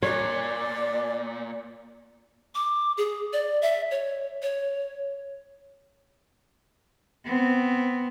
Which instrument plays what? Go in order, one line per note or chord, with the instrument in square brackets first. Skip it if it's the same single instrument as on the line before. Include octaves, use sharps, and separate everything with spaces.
[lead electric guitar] A#2 [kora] C#5 [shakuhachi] D5
[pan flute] D6
G#4
D5
E5
C#5
C#5
[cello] B3 C4